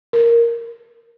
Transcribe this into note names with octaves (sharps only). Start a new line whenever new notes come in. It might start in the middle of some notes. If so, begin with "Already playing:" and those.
A#4